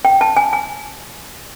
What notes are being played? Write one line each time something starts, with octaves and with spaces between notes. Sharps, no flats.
G5
A5
G#5
G#5